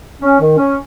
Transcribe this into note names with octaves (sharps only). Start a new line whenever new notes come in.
C#4
D#3
C#4